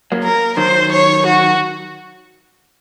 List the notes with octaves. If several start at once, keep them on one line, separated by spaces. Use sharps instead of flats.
F#3 A#3
A#4
D#3 F#3 C5
C#5
F#4